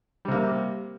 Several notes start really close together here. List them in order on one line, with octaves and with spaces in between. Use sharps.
G3 C3 A#3